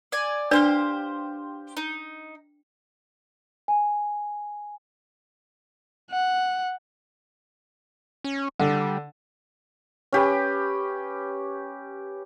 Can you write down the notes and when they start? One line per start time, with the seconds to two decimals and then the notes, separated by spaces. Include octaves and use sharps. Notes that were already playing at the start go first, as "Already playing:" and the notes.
0.12 D5 G#5
0.51 D4 G4 B4 C5 D5 F5
1.77 D#4
3.68 G#5
6.11 F#5
8.24 C#4
8.60 D3 G3
10.13 C#4 G4 B4